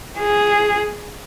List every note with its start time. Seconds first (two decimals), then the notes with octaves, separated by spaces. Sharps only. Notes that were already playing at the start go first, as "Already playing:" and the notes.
0.19 G#4